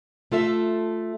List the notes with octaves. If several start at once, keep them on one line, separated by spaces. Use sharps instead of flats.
A3 F4 A4 E5